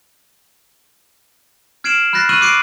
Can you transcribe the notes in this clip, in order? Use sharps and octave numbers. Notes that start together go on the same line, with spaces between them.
F6 G#6 C7 D7 E7 F#7
B5 F6 F#6 A6 A#6 C7
C#6 E6 F#6 D#7 F#7
D6 F#6 C7 D7